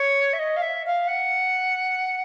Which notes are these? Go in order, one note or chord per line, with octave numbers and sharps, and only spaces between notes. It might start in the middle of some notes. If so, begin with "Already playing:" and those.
Already playing: C#5
E5
D#5
F5
E5
F5
F#5